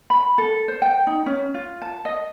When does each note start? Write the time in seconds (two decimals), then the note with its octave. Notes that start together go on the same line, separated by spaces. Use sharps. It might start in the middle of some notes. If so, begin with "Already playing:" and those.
0.10 B5
0.38 A4
0.68 C5
0.82 G5
1.07 D#4
1.26 C#4
1.54 F4
1.82 A5
2.05 D#5